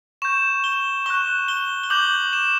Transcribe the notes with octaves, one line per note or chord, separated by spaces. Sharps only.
C#6 G6 E7
G7
C#6 F#6 G7
G7
G7
D6 G6 F#7
E7